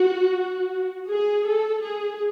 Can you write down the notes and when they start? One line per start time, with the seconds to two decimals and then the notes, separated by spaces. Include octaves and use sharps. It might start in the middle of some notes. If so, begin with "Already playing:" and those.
Already playing: F#4
1.10 G#4
1.46 A4
1.82 G#4